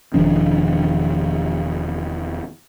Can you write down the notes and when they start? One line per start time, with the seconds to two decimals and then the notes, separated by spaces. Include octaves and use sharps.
0.14 E1 D#3 F3 D4